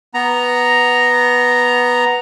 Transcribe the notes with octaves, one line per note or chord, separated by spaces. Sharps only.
B3 A#5